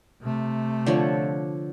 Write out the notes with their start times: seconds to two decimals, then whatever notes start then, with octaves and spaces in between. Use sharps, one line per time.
0.21 C3 A3
0.86 D3 F3 C#5